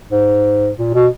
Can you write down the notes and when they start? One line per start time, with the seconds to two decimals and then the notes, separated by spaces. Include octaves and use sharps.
0.11 G#2
0.78 A#2
0.94 B2